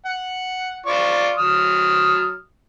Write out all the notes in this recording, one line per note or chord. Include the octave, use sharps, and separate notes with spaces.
F#5
F4 D5 C#6
F#3 D#6 F6